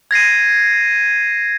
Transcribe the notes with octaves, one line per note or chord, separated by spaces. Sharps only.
G#6 A#6 C7 D#7